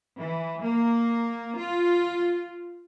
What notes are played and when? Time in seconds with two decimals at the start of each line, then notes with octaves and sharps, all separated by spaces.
0.18 E3
0.63 A#3
1.58 F4